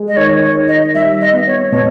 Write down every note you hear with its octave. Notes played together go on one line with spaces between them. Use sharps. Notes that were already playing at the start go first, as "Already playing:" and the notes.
Already playing: G#3
D#5
D#3 C#5
C#5
D#3
D#5
G3 E5
D#5
B3
C#5
B2 C#5